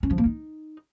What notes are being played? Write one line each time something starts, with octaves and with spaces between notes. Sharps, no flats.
C#4
F3
A#3
D#4